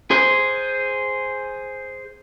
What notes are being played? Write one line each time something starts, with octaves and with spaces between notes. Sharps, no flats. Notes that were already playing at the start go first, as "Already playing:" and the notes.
G#4 C5